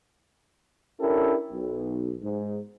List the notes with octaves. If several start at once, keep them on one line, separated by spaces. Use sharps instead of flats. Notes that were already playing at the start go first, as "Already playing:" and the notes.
C#4 D4 E4 G4 A4 A#4
B1
G#2